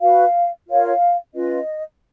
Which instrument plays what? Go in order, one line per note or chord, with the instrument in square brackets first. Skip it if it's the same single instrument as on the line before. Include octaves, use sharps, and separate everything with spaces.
[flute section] F#4 B4 F5
F4 A#4 C#5 F5
C#4 F4 B4 D#5